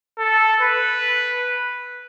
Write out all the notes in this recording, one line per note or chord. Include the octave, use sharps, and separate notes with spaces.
A4
B4